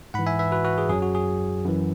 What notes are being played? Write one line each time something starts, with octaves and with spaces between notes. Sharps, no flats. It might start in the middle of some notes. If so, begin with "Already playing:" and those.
G#2 E3 F#5 B5
E5 G#5
B4 E5
F#4 B4
F#4 B4
G#4
F#2 F#3 G#4
F#4
G#4
F#2 E3